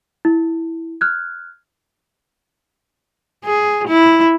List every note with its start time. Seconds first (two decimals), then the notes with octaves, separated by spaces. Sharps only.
0.25 E4
1.01 F6 F#6 G#6
3.45 G#4
3.88 E4